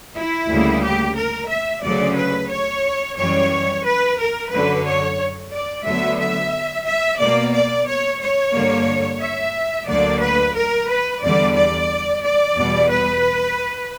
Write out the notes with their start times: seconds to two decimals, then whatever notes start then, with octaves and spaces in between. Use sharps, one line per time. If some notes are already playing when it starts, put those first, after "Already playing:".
0.16 E4
0.49 D2 C#3 G3 A#3
0.83 G4
1.16 A#4
1.49 E5
1.83 D2 C#3 F#3 D5
2.16 B4
2.50 C#5
3.17 F#2 E3 G3 C#5
3.84 B4
4.18 A#4
4.51 F#2 D3 F#3 B4
4.85 C#5
5.52 D5
5.85 D2 D3 F#3 B3 E5
6.19 E5
6.85 E5
7.19 B2 A#3 D5
7.53 D5
7.86 C#5
8.20 C#5
8.53 G2 D3 A#3
9.20 E5
9.87 D2 D3 F#3 A#3 D5
10.21 B4
10.55 A#4
10.88 B4
11.22 E2 D3 G3 D5
11.55 D5
12.22 D5
12.55 E2 B2 G3
12.90 B4